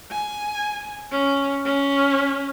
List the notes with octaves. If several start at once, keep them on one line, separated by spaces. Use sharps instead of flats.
G#5
C#4
C#4